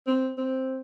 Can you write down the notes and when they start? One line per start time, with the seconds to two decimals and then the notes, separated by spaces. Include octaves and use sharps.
0.07 C4
0.37 C4